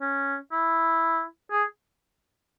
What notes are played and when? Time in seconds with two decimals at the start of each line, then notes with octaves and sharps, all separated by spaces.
0.01 C#4
0.52 E4
1.51 G#4